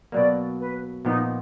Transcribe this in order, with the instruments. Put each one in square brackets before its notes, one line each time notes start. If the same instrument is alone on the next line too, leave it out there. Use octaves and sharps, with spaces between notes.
[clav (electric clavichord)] B2 F#3 A#3 [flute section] D5
[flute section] B4
[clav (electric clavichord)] A#2 F3 B3 [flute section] D#4